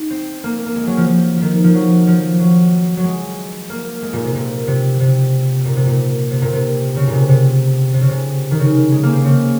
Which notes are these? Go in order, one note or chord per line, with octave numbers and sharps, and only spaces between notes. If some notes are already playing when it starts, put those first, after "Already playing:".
Already playing: D#4
C4
A#3
A#3
G#3
F#3
F3
F3
F3
D#3
F3
F#3
F3
F#3
F#3
G#3
A#3
G#3
A#2
C3
A#2
C3
C3
A#2
C3
A#2
C3
A#2
C3
C#3
A#2
C3
C3
C3
C#3
C3
D#3
C#3
G#3
A#3
C4
C#3